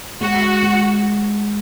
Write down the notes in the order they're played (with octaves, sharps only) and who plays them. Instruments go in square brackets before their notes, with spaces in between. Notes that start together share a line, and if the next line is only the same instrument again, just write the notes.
[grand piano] G#3 [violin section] F#4
[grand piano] G#3